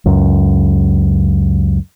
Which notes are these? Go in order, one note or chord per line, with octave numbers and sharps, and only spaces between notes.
C#2 F#2